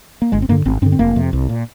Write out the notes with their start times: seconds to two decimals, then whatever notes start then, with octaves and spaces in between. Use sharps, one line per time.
0.22 A#3
0.32 G1 G#3
0.42 C4
0.49 G2 A#3
0.52 D3
0.65 G#1 C4
0.82 G2 C4
0.86 D3
0.92 C4
0.99 F1 A#3
1.16 F2 C3
1.33 C2
1.49 A#2